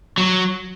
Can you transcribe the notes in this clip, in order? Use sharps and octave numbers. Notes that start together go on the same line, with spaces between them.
F#3